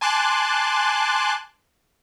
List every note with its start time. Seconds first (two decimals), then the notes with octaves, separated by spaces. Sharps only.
0.01 G#5 A5 C6 D6 F#6